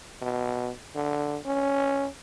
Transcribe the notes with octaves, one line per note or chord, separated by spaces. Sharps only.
B2
D3
C#4